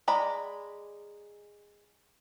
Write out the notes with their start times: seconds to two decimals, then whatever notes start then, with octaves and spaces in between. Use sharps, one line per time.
0.08 G#3 D5 A#5 B5